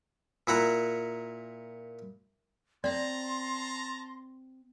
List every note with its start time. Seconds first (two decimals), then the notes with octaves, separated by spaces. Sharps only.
0.47 A#2 E4 F#5 A#5
2.84 C4 D5 A5 A#5 C6